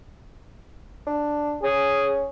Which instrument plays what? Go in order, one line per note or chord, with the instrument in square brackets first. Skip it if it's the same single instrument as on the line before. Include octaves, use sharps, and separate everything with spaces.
[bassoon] D4
[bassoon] C#4 [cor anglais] G#4